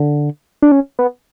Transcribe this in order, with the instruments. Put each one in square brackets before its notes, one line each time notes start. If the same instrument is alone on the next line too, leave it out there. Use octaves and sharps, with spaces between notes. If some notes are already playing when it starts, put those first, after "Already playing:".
Already playing: [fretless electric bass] D3
[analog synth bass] D4
C#4
B3